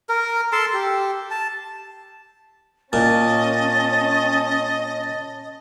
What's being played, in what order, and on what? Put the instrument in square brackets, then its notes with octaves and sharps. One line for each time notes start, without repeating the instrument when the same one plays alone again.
[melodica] A#4
A4 A5 C6
G4
A5
[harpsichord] A#2 [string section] C#4 [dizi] D#5 [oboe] A5